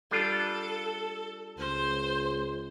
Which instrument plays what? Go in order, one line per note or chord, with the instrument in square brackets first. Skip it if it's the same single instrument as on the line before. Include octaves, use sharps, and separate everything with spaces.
[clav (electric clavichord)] G3 D4 F4 [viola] A4
[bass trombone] C#2 [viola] C5